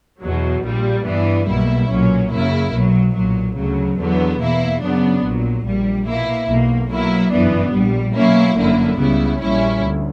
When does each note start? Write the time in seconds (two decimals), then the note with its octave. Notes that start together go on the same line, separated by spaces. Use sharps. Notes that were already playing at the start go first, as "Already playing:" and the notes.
0.22 E2 B2 F#3
0.64 A#1 A#2 G3
1.05 G2 E3 B3 D4
1.47 B1 B2 G3 A#3 E4
1.89 B1 A#2 F#3 C#4
2.31 F#2 C#3 F#3 A#3 E4
2.72 B1 B2 F#3
3.14 B1 A#2 F#3
3.56 D2 C#3 F#3
3.97 E2 D3 F#3 B3
4.39 E2 B2 A#3 E4
4.81 F#2 C#3 F#3 B3 D4
5.23 A#1 A#2 F#3
5.64 A#1 A#2 G3
6.06 B2 A#3 E4
6.48 B1 B2 A#3
6.89 B2 F#3 A#3 E4
7.31 G1 F#2 E3 B3 D4
7.72 A#1 A#2 G3
8.14 B2 F#3 A#3 C#4 E4
8.56 G1 F#2 D3 A#3 E4
8.98 C#2 C#3 G3 B3 E4
9.40 A#1 A#2 G3 C#4 E4
9.81 D2